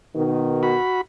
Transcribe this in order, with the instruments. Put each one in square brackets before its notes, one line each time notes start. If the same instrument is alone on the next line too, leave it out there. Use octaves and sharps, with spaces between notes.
[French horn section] B2 D#3
[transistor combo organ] F#4 B5